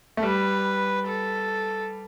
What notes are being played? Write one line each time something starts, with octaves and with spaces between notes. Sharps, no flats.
A3
G3 B4
A4